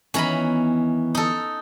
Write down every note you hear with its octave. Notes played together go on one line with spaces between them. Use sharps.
D#3 E3 B3 C#4 A#5 B5
D#4 A4